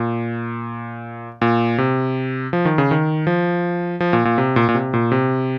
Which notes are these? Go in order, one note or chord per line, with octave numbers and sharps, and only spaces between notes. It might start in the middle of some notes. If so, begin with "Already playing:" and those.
Already playing: A#2
A#2
C3
F3
D#3
C#3
D#3
F3
F3
A#2
A#2
C3
A#2
A#2
C3
A#2
C3